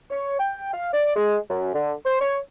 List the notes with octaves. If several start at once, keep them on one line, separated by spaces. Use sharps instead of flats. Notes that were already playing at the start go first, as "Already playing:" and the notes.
C#5
G5
F5
D5
G#3
F#2
D3
C5
C#5